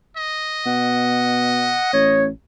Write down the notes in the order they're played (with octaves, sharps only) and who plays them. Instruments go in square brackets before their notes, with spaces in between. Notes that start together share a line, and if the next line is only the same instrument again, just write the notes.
[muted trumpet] D#5
[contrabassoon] B2 [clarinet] F#5
[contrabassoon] A1 [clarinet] C#5